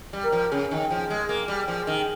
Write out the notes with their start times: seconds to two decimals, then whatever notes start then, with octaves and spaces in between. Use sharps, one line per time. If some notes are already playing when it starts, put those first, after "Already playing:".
0.13 G3
0.23 A#4
0.32 F3
0.52 C#3 G#4
0.71 D#3
0.90 F3
1.10 G#3
1.29 A#3
1.48 G3
1.68 F3
1.87 D#3